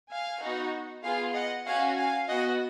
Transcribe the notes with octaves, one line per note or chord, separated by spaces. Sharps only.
F5 G#5
B3 D#4 F#4
B3 F4 G#4 F5 G#5
D#5 F#5
C#4 F#4 F5 G#5
F5 G#5
B3 F#4 D#5 F#5